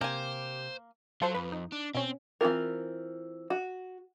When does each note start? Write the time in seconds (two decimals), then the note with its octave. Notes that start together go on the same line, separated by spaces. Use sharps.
0.01 C3 A#3 G4 C5 G#5
1.22 F#3 F4 A4 C5
1.35 F2 B4
1.52 D#4
1.72 D4
1.95 B2 C4 C#4
2.41 E3 C4 F4 A#4
3.50 F#4